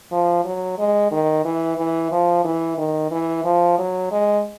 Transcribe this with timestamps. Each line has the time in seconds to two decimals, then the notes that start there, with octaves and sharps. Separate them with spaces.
0.12 F3
0.45 F#3
0.79 G#3
1.11 D#3
1.45 E3
1.78 E3
2.12 F3
2.44 E3
2.78 D#3
3.11 E3
3.45 F3
3.78 F#3
4.12 G#3